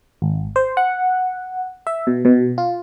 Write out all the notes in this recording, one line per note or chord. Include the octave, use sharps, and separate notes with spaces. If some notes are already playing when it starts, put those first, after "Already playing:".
G#1
C5
F#5
E5
B2
B2
F4